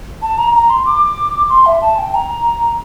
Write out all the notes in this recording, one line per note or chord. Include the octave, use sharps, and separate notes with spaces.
A5
A#5
A#5
C6
D6
C6
E5
A5
G5
A#5